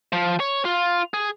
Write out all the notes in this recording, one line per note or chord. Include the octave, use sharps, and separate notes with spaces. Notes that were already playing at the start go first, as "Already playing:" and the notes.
F3
C#5
F4
G#4